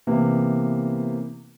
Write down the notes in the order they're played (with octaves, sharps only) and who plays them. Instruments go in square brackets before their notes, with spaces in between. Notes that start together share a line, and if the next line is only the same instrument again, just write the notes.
[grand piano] C3 E3 A#3 B3